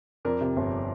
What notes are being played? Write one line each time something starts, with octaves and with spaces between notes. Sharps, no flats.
F2 A#4 D5
C3
G1